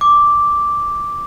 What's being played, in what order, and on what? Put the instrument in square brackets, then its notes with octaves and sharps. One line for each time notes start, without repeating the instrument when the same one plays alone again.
[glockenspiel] D6